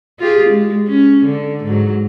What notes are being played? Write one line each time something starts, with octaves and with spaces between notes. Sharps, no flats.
F4 G4 G#4
G#3
C#4
D3
G#2 F#3